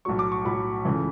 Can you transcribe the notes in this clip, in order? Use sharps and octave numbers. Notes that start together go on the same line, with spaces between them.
B1 A2 F#3 C#6
D6
C#6
B1 A2 F#3 B5
C#2 C#3 E3 A3